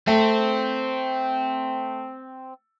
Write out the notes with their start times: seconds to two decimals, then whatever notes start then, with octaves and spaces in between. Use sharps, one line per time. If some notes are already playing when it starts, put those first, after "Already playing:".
0.07 A3 C4